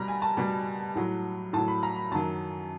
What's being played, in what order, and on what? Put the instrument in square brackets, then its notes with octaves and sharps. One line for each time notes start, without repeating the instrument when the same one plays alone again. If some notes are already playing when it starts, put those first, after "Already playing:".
Already playing: [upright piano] B2 G3 A#5 B5
G#5
A5
B2 G3
A2 F#3
A2 F#3 A5
B5
A#5
B5
F#2 D#3 F#3 A5